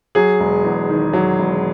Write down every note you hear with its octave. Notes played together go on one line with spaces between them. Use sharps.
F#3 G#4
E1
E2
D#3
F#3
E1